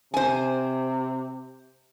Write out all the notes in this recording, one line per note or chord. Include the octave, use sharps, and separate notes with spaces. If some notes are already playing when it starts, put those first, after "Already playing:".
C3 C5 G#5